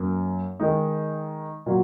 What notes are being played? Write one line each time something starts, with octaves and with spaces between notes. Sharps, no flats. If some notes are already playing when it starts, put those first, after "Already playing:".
Already playing: F#2 A#3
D#3 G#3 D#4
A#2 F#3